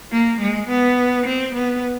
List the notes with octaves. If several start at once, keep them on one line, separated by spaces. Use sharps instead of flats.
A#3
G#3
B3
C4
B3